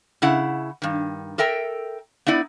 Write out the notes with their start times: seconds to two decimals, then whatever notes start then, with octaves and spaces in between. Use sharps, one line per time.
0.22 C#3 E4 F#5
0.82 G2 D#3
1.38 A4 A#4 E5 G5
2.26 B3 D#4 E4 D5